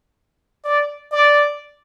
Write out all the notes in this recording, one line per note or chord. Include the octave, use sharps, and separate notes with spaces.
D5
D5